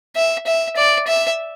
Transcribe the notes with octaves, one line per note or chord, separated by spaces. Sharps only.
E5
E5
D5
E5